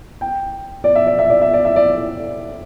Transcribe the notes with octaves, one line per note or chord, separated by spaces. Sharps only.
G5
D5
E5
D5
E5
D5
E5
D5
E5
D5